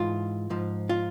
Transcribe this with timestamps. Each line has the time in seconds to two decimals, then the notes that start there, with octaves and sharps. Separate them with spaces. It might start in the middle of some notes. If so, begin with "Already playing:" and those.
Already playing: G#2 E3 F4
0.50 G#2 F3
0.89 F4